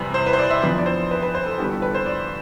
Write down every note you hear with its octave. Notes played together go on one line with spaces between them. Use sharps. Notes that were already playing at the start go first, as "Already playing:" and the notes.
Already playing: E2 C3 G3 C4 B4
C5
B4
C5
D5
E5
F2 E3 B3 D4 D5
D5
C5
B4
B4
C5
A4
G1 G2 E3 B3 D4 G4
A4
B4
C5
D5